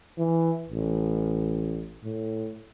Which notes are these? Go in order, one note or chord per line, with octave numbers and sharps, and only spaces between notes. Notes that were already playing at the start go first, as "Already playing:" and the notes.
E3
A1
A2